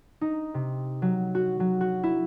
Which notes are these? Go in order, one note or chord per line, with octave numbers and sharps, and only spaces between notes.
D#4
C3
F#3
F#4
F#3
F#4
E4